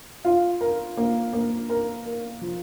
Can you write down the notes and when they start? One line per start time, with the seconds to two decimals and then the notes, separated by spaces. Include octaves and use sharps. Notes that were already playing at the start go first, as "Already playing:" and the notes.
0.25 F4
0.61 A#4
0.97 A#3
1.33 A#3
1.69 A#4
2.05 A#4
2.41 F3